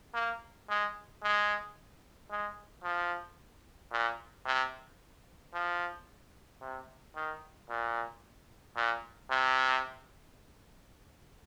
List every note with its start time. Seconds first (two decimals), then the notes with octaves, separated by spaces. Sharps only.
0.14 A#3
0.69 G#3
1.23 G#3
2.31 G#3
2.84 F3
3.92 A#2
4.46 C3
5.54 F3
6.61 C3
7.15 D#3
7.69 A#2
8.76 A#2
9.30 C3